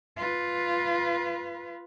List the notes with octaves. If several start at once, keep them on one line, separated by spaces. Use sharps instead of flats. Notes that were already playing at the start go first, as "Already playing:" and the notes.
F4 B4